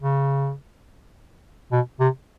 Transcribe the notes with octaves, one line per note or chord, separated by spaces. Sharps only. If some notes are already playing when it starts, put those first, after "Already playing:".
C#3
B2
C3